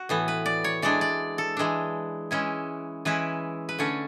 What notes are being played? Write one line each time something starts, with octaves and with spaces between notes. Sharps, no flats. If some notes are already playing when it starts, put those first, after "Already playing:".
Already playing: F#4
A2 E3 B3
B4
D5
C#5
E3 G#3 D4 D5
D5
A4
E3 G#3 D4
E3 G#3 C#4 E4
E3 G#3 C#4 E4 B4
B4
D3 A3 C#4 C#5